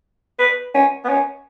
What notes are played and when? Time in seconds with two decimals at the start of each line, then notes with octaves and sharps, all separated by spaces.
0.39 B4
0.74 C#4
1.04 B3
1.09 C#4